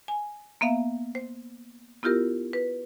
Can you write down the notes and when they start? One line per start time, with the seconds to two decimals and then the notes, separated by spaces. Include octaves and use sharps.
0.08 G#5
0.61 A#3 B3 E5 F5
1.15 C5
2.03 B3 E4 F4 G4 A#4
2.53 B4